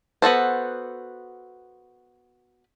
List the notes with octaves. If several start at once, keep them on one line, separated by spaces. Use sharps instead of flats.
B3 F#4 A4 C5